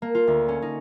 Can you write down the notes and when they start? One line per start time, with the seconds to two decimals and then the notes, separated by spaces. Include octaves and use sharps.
0.02 A#3
0.15 F4
0.27 D2
0.48 C#4
0.62 D#4